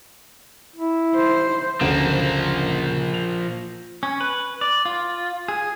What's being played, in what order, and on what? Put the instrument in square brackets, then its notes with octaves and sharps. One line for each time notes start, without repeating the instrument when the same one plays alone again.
[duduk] E4
[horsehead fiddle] C5
[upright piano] F#1 D2 D7 [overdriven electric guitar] F3 A#3
[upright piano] F7
[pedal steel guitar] C#4
B4
D5
F4
G#4